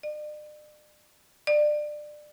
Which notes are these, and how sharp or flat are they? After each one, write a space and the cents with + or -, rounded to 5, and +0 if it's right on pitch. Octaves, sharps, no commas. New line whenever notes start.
D5 +40
D5 +25